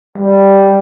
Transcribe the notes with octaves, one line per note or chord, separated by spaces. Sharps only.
G3